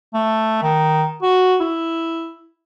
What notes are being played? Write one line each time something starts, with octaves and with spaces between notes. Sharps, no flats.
A3
D#3
F#4
E4